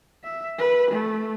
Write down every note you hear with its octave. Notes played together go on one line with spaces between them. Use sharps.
E5
B4
A3